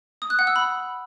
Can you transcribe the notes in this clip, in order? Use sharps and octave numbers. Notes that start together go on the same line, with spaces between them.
D#6
F#6
F#5
E6
B5